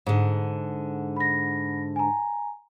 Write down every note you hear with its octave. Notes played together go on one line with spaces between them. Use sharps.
G#2 D3
B5 A#6
G#5 A#5